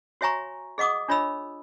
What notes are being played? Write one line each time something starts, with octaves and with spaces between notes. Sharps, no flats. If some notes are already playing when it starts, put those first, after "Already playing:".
F#4 C#5 E5 G#5 A#5 C#6
G#4 D#5 F#5 D6 D#6
D4 F4 C#5 D#5 B5 E6